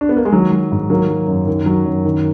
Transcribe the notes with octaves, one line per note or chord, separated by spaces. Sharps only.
D4
B3
A#3
G#3
D#3 F#3
F#3
G#2
D#3 F#3 A#3
F#3
F#2
D#3
F#3
F#2
D#3